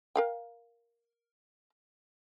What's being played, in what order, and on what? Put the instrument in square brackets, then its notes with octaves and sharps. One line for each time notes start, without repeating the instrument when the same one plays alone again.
[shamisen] A#4 F5 G5